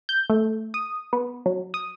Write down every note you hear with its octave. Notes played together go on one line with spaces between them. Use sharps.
G6
A3
D#6
B3
F#3
D#6